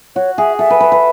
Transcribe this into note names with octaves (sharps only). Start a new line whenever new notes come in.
F#4 C#5
G#4 E5
A4 E5
B4
B4
B4